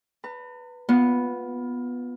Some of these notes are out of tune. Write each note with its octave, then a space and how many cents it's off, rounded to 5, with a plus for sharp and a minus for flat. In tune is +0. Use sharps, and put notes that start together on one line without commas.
B4 +0 A#5 -45
B3 -5 F4 +20